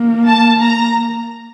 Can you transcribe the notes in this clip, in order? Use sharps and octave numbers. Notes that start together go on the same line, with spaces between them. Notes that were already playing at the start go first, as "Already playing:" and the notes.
Already playing: A#3
A5
A#5